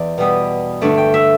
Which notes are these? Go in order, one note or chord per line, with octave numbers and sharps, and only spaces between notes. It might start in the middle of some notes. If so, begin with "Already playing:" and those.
Already playing: E2 D5
B2 G3 B3
G2 D3 A3 D5
G5
E5